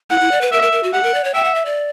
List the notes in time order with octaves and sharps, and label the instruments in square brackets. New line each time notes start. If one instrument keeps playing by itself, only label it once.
[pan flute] E4 [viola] F#5
[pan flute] E4
D5
B4
[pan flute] A#4 [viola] E5
[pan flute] A#4
A#4
F#4
[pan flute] G4 [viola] F#5
[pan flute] A#4
D5
C#5
[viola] E5 [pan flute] G5
[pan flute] F#5
E5
D5